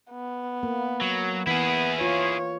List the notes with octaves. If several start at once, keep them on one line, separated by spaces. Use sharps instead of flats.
B3
A#3
F#3
E3 B3 E4 G#4
F4 C#5